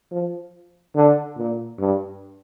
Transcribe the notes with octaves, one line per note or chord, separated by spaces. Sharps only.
F3
D3
A#2
G2